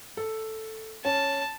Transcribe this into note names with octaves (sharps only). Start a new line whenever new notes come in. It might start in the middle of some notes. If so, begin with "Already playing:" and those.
A4
C#4 A5